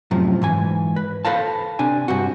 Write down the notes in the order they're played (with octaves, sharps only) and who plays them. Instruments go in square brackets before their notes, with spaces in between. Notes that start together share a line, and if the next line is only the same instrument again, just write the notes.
[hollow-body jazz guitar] F#2 A2 C3 F3
G#2 E3 G#5
B4
A4 B4 C5 F5 A5
C3 D4 G#5
G2 C3 F#4